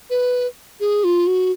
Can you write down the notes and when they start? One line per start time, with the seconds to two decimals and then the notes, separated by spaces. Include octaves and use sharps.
0.10 B4
0.80 G#4
1.04 F4
1.27 F#4